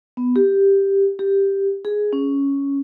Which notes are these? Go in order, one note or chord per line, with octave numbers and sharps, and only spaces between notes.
B3
G4
G4
G#4
C#4